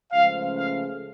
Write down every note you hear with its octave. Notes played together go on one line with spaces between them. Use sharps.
C#2 C#3 F3 A3 F5
F5